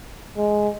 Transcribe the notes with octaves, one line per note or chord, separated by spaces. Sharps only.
G#3